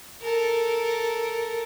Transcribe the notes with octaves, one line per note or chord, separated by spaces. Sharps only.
A4 A#4